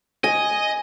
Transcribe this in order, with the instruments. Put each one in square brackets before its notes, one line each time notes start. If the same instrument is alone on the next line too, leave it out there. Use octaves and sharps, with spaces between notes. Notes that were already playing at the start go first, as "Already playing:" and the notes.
[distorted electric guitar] D#5 [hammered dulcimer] G#5